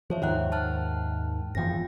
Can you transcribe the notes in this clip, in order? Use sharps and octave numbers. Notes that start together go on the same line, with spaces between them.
F3 C5 C#5 E5
D#2 G#2 D#3 E5 F#5 F#6
A5 F6 F#6
F#1 E2 F3 G5 A#6